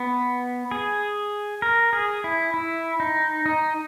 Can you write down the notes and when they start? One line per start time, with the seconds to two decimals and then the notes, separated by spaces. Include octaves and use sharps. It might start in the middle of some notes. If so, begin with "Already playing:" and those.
Already playing: B3
0.71 G#4
1.62 A#4
1.93 G#4
2.24 E4
2.54 E4
3.00 D#4
3.46 D#4